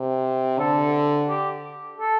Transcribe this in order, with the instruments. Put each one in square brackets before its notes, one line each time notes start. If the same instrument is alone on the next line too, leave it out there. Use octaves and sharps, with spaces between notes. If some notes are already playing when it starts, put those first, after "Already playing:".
Already playing: [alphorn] C3
[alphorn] D3 [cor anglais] A4
[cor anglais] G4
A4